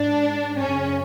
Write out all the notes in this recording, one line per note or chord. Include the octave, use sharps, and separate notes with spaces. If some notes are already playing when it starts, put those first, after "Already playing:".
Already playing: G#2 D4
F#2 C#3 C#4